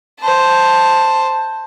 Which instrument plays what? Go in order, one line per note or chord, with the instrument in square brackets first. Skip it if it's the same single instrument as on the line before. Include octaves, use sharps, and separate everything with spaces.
[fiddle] C5 A5